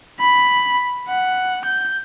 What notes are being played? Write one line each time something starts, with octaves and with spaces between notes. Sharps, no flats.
B5
F#5
G6